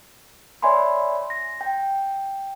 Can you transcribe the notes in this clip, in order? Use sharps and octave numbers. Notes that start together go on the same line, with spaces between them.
C#5 D5 E5 G#5 B5 C6
A#6
G5